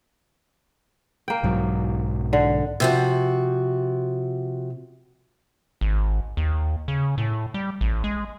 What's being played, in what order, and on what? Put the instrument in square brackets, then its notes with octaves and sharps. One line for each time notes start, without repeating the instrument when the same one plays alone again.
[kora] A#3 G5
[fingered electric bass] B1 G#2 F#3
[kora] D3
[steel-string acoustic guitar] C3 F3 F#4
[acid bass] G#1
D#2
C#3
A2
G3
A1
G#3